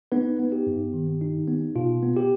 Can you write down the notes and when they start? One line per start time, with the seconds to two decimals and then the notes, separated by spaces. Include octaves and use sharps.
0.12 B3 D#4 B4
0.40 B3
0.52 G4
0.66 G2
0.93 D#3
1.21 D#4
1.48 B3
1.76 B2 F4
2.03 B3
2.16 G4